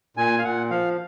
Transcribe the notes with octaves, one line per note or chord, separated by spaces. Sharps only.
A#2 G#5
F5
A#2 F#5
F3 F5